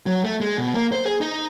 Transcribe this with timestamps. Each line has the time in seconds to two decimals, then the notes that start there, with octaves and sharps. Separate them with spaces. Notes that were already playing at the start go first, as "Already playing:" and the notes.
0.06 F#3
0.24 A3
0.41 G#3
0.58 B2
0.74 A#3
0.92 C5
1.05 G#4
1.21 D#4